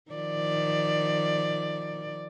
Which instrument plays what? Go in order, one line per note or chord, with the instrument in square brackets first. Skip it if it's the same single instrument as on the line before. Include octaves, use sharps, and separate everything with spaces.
[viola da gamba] D#3 F3 D5